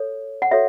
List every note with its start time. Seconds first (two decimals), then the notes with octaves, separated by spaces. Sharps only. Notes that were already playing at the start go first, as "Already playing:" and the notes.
Already playing: A4 C#5
0.42 F#5
0.51 F#4 A4 C#5 E5